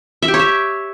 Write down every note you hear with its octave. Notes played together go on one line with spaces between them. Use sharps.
E5
G4
C#5
E5